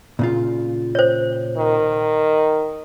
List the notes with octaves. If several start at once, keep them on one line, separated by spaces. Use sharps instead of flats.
A#2 C#3 F4
C5 C#5
D#3